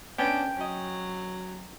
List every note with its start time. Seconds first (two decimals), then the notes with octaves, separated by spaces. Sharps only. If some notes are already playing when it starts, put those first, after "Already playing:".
0.18 B3 C#4 D4 G5
0.57 F#3 C#4 D#5